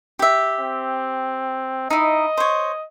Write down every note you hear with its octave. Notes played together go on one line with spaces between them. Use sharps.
G4 E5
C4
D#4 E4 D#5
C5 C#5